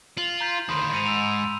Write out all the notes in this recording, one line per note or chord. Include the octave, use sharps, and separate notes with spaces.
F4 F#7
A#5 G6 B6
D2 D#3 B5 C6 D#6
G#2 C#7 D#7 F7
E6 F7